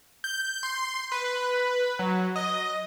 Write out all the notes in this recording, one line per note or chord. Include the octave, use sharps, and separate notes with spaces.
G6
C6
B4
F#3
D#5